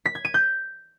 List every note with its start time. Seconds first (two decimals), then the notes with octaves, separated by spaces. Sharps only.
0.06 B6
0.15 G#6
0.25 D#7
0.34 G6